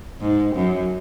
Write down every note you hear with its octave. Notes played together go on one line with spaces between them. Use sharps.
G#2
F#2